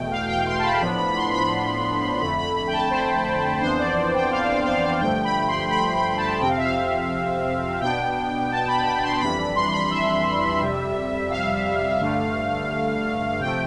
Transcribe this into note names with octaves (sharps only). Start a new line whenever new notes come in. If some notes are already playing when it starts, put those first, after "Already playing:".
Already playing: E2 B2 A3 G5
F5
G5
C6
A5
B5
A2 F3 B3 D4 B5
B5
B5
C6
B5
F2 D3 A3 B5
B5
B5
G5
A5
C5
F2 E3 B3 D4 C5
D5
G5
F5
F5
F5
F5
G2 D3 F3 A3 G5
B5
C6
B5
B5
A5
F2 C3 F3 C4 G5
F5
E5
F5
B2 B3 D4 G5
A5
B5
B5
C6
F2 E3 G3 D4 B5
B5
C6
B5
E5
F2 C3 G3
F5
G2 D3 A3
C3 F3 A3 G5